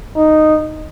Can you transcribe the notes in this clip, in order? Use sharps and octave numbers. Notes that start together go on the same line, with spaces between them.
D#4